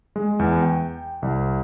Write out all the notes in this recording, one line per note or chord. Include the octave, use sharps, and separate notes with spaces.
G#3
E2
G5
C2